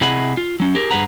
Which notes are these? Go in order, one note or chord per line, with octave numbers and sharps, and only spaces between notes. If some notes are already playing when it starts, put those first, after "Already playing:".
C3 E4 G#4 D#5 F#5 B5
F4
F#3 C#4
G4 G#4 A#4
G2 G#4 B4 F#5 A#5